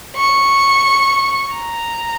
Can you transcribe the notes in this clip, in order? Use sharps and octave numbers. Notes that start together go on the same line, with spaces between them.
C#6
A#5